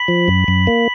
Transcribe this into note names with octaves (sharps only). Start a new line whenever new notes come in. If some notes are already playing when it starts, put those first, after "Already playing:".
Already playing: B5
F3
F#2
F#2
A#3